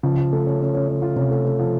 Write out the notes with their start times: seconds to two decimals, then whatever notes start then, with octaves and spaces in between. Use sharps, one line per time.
0.03 C#3 F3
0.17 F3
0.33 A3
0.47 C#4
0.61 C#4
0.74 C#4
0.88 C#4
1.02 F4
1.16 C3 C#4
1.31 A3
1.45 A3
1.59 F3